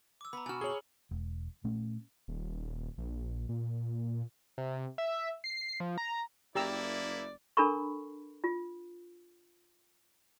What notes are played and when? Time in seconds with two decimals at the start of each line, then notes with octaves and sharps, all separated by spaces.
0.21 D6 E6
0.33 B3 A#5 B5
0.46 B2 F#4 G#5 F6
0.61 G#4 C#5 F#7 G7
1.11 E1
1.64 A#2 A3 C#4
2.28 D#1
2.98 A#1
3.49 A#2
4.58 C3
4.98 E5
5.44 C7
5.80 F3
5.98 A#5
6.55 F#1 A3 A#3 E4 G4 D5 A#5 E6
7.57 D4 A4 A#4 A#5 B5 C#6
8.44 F4